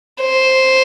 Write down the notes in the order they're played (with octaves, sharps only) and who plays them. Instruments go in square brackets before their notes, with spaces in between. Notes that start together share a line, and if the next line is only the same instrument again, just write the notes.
[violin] C5